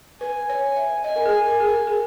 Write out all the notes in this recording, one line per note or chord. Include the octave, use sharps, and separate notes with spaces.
B4 G#5
C#5
E5
D#5 G#5
A#4
G#4
A#4
G#4
A#4
G#4